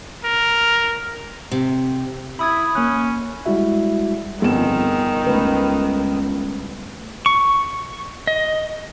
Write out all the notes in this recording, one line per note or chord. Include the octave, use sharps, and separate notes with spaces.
A#4
C3
E4 B5 D#6 G#6
A#3 C#4 F#6
G3 G#3 E4 F#4 E5
G1 F2 D#3 B3 G#4 E7
C#2 A3 B4
C#6
D#5